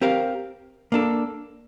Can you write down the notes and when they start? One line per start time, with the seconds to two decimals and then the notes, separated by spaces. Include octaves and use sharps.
0.01 C4 G4 A#4 F5
0.92 A#3 D4 A4